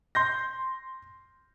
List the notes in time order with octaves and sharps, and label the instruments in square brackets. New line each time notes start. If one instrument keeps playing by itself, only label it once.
[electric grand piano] C6 G6 A#6